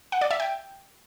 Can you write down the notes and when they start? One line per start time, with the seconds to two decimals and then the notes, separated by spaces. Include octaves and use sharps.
0.12 F#5
0.21 D5
0.31 E5
0.40 G5